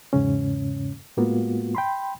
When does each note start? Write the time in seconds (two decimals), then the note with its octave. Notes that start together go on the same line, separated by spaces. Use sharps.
0.13 E2 G#2 C#3 C#4
1.17 A2 G#3 A#3 B3 F4 F#4
1.75 G5 B5 C6